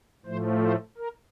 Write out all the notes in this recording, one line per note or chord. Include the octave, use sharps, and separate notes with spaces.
A2 F3 A3 C5
C5
A#4